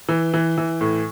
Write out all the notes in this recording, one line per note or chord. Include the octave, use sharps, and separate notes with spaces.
E3
E3
E3
A2